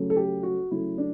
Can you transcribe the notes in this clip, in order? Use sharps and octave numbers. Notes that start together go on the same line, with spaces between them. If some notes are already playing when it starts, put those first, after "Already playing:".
Already playing: C#3 F#3 A3
A4
G4
F#4
C#3 F#3 A3 E4
D4